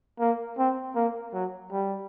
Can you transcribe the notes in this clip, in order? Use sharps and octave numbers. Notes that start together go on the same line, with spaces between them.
A#3
C4
A#3
F#3
G3